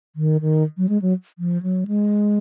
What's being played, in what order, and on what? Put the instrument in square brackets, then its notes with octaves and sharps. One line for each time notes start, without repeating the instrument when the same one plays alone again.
[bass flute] D#3
D#3
F#3
G#3
F#3
F3
F#3
G#3